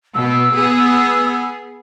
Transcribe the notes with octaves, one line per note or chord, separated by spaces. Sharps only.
B2 B3 E6
B3 G#4